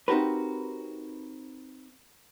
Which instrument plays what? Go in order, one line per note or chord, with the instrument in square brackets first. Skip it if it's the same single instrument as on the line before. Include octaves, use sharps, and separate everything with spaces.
[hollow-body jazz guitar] C4 D#4 F#4 G4 A#4 B4